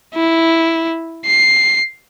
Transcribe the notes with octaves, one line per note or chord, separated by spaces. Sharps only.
E4
C7